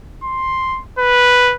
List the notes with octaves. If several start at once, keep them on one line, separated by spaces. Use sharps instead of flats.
C6
B4